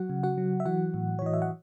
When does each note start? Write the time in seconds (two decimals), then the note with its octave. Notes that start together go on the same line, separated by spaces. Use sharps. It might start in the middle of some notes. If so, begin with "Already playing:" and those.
Already playing: F#3 F#4 F#5
0.10 C#3
0.23 F#4 F#5
0.38 F#3
0.60 E5
0.66 E3 F#4 F#5
0.94 A2
1.19 C#5
1.22 E3 D#5
1.34 E5
1.42 F#5